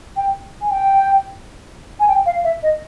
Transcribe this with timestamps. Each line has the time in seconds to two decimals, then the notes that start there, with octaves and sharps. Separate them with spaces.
0.16 G5
0.61 G#5
0.71 G5
2.00 G#5
2.08 G5
2.26 F5
2.44 E5
2.63 D#5